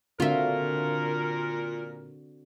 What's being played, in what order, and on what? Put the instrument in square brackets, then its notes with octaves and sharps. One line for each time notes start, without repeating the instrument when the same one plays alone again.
[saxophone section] A#2 A#4 [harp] D3 [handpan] C4 D4 F#4 [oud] F4 E5